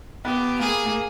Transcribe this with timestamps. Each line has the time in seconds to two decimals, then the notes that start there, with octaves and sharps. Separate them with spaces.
0.25 B3 G4
0.59 A#3 G#4
0.86 A#3